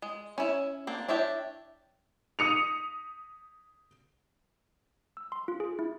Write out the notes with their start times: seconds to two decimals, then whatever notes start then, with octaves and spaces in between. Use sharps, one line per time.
0.02 G#3
0.38 C#4 E4 C#5
0.87 A#3 C4 D4
1.08 D4 E4 C#5 E5 G5
2.39 D#6 C#7 F7
5.17 E6
5.32 C6
5.48 F4
5.60 G#4
5.79 E4